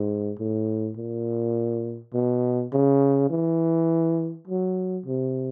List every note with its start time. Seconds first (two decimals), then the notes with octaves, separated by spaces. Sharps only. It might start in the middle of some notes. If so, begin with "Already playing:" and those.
Already playing: G#2
0.39 A2
0.97 A#2
2.14 B2
2.73 C#3
3.30 E3
4.47 F#3
5.06 C3